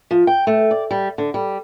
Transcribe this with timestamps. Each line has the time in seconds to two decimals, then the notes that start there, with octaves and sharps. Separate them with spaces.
0.11 F3
0.27 G5
0.47 A3
0.71 D5
0.91 G3
1.18 D3
1.34 G3